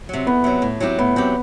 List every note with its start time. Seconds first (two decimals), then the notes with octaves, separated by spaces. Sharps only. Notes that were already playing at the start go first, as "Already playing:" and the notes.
0.09 C3 F#3
0.27 E2 B3
0.44 C3 F#3
0.62 A2
0.80 F#3 C4 E4 G4
0.98 A2 B3
1.16 F#3 C4 E4 G4